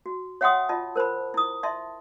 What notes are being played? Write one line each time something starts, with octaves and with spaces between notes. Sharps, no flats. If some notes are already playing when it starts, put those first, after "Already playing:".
F#4
C#5 E5 F#5 G5 C6 D#6
F4 D#5 A5
A#4 C5 A5 B5
E4 D#6
D#5 E5 A5 C6